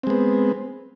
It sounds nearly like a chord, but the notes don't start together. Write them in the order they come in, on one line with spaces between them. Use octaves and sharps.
C4 G#3 B3